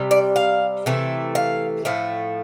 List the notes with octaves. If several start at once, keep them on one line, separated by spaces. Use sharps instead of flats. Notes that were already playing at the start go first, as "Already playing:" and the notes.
Already playing: C3 G3
D5
F5
C3 E3 A3
F5
A2 F3 A3